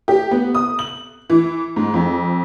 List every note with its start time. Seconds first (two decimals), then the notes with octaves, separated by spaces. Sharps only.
0.08 G4
0.31 B3
0.55 D#6
0.79 F#7
1.30 E3
1.76 G#2
1.94 F2